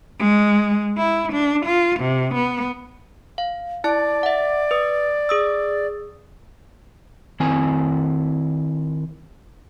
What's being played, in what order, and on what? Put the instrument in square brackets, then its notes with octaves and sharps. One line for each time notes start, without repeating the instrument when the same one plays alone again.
[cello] G#3
E4
D4
F4
C3
B3
[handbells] F5
[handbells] E4 A5 [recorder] D5
[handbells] E5 F#5
B4 D#6
G#4 D#6 E6
[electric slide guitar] D#3 C4 E4 G#5